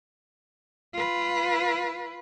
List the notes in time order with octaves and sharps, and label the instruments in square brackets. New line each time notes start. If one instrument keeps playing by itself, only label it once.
[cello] F4 B4